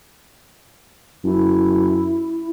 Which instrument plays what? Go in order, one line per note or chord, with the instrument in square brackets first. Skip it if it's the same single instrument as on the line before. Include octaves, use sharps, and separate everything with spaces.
[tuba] F#2 [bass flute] E4